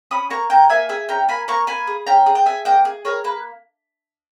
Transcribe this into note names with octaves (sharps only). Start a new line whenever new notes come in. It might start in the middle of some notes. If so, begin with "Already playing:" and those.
C#4 B5 D#6
A#3 A#5 C#6
A#3 G5 A#5
A#3 E5 G#5
G#4 E5 G#5
C#4 G5 A#5
A#3 G#5 B5
A#3 A#5 C#6
A#3 G#5 B5
G#4
C#4 G5 A#5
G#4
G5
G#4 E5 G#5
A#3 D#5 G5
G#4
G#4 A#4 C#5
A#3 B4